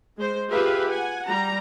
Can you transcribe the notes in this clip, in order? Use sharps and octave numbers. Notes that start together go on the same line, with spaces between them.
G#3 C5
F4 G4 G#4 B4 E5 F5
F#5 G#5
G3 A#5